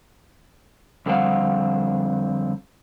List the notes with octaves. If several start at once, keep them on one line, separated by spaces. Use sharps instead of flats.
F2 D3 G3 C4 F5 F#5